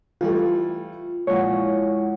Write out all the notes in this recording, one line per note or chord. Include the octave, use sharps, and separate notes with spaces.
E3 G3 A3 F4
A#2 F3 G#3 E4 C#5 F#5